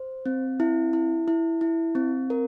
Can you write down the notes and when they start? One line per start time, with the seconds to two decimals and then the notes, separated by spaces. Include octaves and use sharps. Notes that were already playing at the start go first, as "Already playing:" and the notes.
Already playing: C5
0.26 C4
0.60 E4
0.93 E4
1.28 E4
1.61 E4
1.95 C4
2.30 A#4